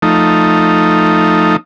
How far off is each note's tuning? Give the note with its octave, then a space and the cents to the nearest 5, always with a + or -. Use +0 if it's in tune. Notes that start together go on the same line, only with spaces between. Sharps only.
F3 +0 A3 +0 D#4 +0